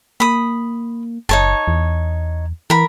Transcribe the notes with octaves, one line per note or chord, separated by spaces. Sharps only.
A#3 B5 D#6
F#1 D#4 C#5 A5
E2
E3 A#4 B5